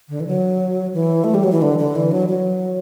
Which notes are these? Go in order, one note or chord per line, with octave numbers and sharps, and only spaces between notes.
D3
E3
F#3
E3
A3
G3
F#3
E3
D3
D3
E3
F#3
F#3